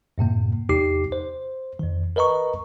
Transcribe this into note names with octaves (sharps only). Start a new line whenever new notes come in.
F#2 A2 C3 A#3
E2 C3 D#4 G4 D6 C7
C5
F2 D#3
A#4 B4 D#5 A#5 C#6